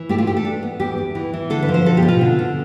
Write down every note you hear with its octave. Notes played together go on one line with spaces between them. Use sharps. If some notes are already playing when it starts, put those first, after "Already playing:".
Already playing: E3
A3 G4
F4
A3 G4
A4
D4
B3
E2 G4
E2
E3
E3
D3 A4
B4
F3
C5
B2 A4
G4
B2
F4
D3
D3